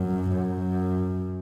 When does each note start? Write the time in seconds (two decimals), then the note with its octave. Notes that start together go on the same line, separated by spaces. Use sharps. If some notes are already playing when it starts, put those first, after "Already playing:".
Already playing: F#2
0.31 F#2